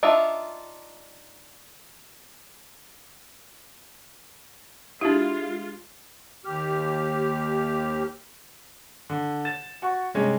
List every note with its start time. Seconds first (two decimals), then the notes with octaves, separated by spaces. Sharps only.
0.03 D4 D#4 F4 E5
5.01 G#3 D4 E4 F4 G4 F5
6.45 D#2 G4 F6
9.10 D3
9.45 A6 E7
9.82 F#4 C#6
10.14 G2 C3 G#3 C#4